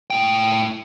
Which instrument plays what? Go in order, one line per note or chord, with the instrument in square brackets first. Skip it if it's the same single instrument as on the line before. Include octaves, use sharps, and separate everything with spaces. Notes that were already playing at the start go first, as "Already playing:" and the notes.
[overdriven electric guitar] A2 G5